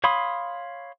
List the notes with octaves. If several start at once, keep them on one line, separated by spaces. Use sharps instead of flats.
C#5 F5 B5 C6 D#6